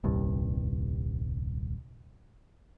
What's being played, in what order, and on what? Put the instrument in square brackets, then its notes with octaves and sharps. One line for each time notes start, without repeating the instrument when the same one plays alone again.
[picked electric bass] D#1 C2 G2